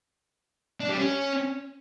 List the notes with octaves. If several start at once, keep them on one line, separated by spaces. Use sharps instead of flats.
D4
G3
C#4